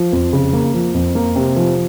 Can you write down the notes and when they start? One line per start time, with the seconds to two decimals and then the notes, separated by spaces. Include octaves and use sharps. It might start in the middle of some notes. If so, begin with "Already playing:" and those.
Already playing: F3
0.13 F2
0.33 C#3
0.53 A#3
0.74 F3
0.94 F2
1.15 A#3
1.36 C3
1.56 F3